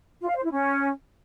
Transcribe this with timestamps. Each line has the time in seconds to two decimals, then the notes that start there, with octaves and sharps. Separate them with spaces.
0.21 F4
0.28 F5
0.36 C5
0.44 E4
0.51 C#4